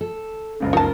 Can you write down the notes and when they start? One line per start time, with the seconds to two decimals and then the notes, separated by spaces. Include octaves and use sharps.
0.01 A4
0.60 F#1 C#2 C#3
0.73 D#4 F4 A#4 A5